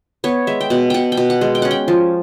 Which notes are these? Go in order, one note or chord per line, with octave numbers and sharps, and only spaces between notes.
B3 C#5
G#3 E5
G5
B2 F#5
B2 F#5 G5
G5
B2
F#5
G#3
G5
C#4 F#5
G5
F3